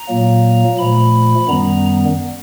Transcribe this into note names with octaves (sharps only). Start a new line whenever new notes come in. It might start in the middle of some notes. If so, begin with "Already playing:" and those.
Already playing: A#5
A#2 F#3 A#3
A#2 F3 A3 B5
F#2 D#3 G3 B3 A#5